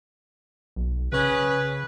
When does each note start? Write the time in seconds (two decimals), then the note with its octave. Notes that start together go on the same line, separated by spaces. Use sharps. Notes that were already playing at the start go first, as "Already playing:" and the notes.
0.76 B1
1.12 C#3 C#4 G#4 B4